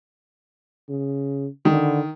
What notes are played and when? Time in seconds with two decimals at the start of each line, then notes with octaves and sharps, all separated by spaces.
0.89 C#3
1.65 D3 D#3